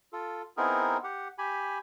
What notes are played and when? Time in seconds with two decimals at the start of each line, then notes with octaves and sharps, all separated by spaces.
0.13 F4 A4
0.57 B3 C4 D#4 E4 G#4 A#4
1.04 G4 F#5
1.38 G4 G#5 B5